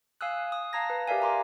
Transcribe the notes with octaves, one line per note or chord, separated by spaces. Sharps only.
F5 G#5 D#6 E6 F#6
D#6
F5 A5 A#5 G#6 A#6
B4
G4 A#4 D5 E5 F5 G#5
G4 A#5 C6 D6